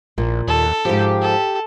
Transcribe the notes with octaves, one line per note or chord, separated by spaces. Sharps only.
A#1 A#2
D#2 A4
G#2 F3 G4
A4